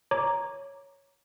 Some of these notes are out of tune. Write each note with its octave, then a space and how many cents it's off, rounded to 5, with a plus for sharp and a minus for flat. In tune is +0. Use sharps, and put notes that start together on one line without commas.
C#5 +0 A#5 +0 D6 +0